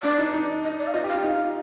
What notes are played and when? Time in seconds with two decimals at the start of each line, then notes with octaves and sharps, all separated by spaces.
0.03 D4 D5
0.18 D#4
0.33 D#4
0.64 D#5
0.79 D5
0.87 F5
0.94 F4 D#5
1.04 G4
1.09 F5
1.14 F4
1.24 D#4 F5